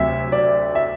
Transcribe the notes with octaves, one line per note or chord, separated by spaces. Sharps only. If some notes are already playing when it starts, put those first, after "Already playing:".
Already playing: D2 C3 F#3 E5
D5
E5